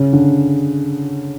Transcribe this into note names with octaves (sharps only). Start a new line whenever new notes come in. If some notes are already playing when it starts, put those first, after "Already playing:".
Already playing: C#3
D3